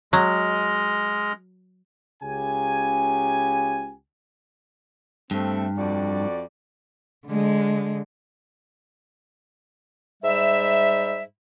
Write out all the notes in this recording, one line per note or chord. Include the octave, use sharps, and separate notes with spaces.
F#3 G#3 D#5 F6
C#2 C#3 G4 G#5
G2 A3 C4
F2 F#4 D5
D3 G#3
G#2 G3 E5